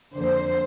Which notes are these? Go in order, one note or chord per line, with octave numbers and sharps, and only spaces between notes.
F2 D3 A#3 C5